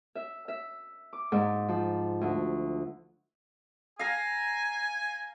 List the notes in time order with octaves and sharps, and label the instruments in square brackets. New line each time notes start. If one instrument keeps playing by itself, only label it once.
[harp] E5
E5
D6
G#2
F3
D2
[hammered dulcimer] F5 A#5 [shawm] G#5